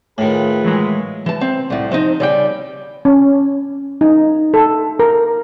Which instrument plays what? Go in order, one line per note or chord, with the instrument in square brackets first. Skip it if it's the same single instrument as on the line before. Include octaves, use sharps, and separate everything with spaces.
[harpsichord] A2 D#3 [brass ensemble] F4 G#4 B4
[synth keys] E3 F#3 G#3
[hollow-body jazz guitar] E3 A5
C4
C2 A2
F3 C4 D#4
C#3 G3 G5
[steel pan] C#4
D#4
A4
A#4